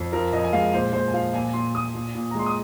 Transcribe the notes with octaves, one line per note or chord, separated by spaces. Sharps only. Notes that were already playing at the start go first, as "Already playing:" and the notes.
Already playing: F2
F3 A#4
F2 D#5
G#5
G#3 F5
A#2 C5
A#2 C5
G#5
F3 F5
A#2 G#5
A#2 C6
A#2 D#6
A#2
A#2
A#5
G#3 C6
D#6